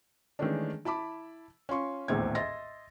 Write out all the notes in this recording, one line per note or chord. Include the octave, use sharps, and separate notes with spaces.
D#3 E3 G#3 A3 C#4 D4
E4 A5 B5 D6
C#4 F4 C6 C#6
D#1 A#1 E2 A2 C4 G#6
D#5 E5 C6 A6 A#6